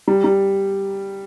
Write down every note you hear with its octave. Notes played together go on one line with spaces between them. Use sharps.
G3
G3